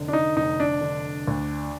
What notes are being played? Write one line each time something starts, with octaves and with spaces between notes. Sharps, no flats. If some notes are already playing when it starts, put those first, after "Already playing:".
Already playing: F1 D3
D4
D#4
F1 D#4
D4
D3
D2